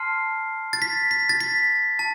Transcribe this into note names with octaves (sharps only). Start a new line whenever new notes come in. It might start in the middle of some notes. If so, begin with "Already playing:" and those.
Already playing: A5 C6 F6 C7
A6
B6
B6
A6
B6
A5